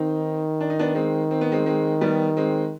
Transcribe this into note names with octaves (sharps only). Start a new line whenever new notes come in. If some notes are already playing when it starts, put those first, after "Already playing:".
Already playing: D#3 C4 D#4
D4
D#4
B3 D4
G#3 C4
C4
B3
G#3 C4
G#3 C4
G3 B3
G#3 C4